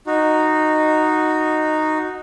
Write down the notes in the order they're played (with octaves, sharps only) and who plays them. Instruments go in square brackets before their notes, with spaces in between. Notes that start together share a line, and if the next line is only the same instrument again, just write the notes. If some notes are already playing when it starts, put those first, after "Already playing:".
[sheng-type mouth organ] D#4 F#4